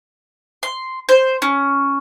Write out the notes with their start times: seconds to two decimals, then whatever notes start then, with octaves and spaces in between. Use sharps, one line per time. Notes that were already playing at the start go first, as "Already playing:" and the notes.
0.63 C6
1.09 C5
1.42 C#4